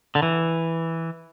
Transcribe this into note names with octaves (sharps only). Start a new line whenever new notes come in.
D3
E3